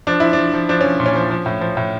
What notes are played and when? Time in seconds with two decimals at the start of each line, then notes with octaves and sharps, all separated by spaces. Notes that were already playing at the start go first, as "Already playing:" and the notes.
0.07 F3 D4
0.20 F3 E4
0.33 D4
0.38 F3
0.54 F3
0.69 F3 D4
0.81 F3 C#4
1.00 A#2
1.06 C#4
1.16 F3
1.30 F3
1.46 A2
1.61 F3
1.77 A2